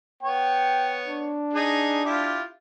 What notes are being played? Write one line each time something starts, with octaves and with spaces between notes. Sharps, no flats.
B3 C#5 G5
D4
D#4 G#4
E4 F4 G4